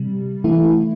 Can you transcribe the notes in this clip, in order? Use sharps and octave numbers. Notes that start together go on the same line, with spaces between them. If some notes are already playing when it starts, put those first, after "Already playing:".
Already playing: C3 G3
E3 A3 E4